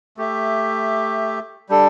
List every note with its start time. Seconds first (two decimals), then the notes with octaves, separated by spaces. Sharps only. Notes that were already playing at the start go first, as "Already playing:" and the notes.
0.17 A3 G4 E5
1.69 G3 D4 A4